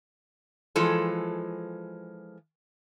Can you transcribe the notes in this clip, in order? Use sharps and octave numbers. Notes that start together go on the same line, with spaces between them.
E3 F3 G#3 A4